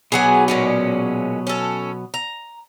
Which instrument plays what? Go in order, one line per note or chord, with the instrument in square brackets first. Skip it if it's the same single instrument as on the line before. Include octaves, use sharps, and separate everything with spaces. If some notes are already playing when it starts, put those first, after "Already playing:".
[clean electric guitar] B2 F#3 B3 [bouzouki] G#4 F#5 G#5
[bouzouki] A#2 G#3 C#4
C#4 A4
A#5